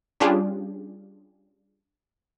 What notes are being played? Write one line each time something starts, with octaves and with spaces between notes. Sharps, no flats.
G3 C#4 D4 F4 G4 G#4